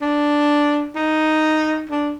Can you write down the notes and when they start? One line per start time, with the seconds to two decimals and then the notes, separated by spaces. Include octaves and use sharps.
0.01 D4
0.95 D#4
1.89 D4